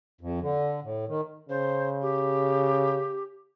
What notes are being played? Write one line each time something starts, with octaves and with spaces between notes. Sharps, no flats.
F2
D3
A2
D#3
C#3 C5
G4